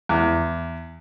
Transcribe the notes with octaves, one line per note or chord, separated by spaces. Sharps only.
E2